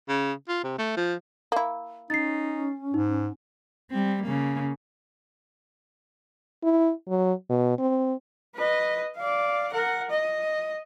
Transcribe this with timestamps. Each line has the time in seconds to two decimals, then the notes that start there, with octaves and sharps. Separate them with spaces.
0.09 C#3
0.49 F4
0.63 C3
0.78 A3
0.97 F3
1.52 A#3 E4
2.10 C#4 D#4 A6 C7
2.94 G#2 D#4
3.91 G3 C4
4.23 C#3 A#3
6.63 E4
7.09 F#3
7.49 B2
7.78 C4
8.56 B4 D#5
9.17 D5 F5
9.72 A#4 F#5
10.10 D#5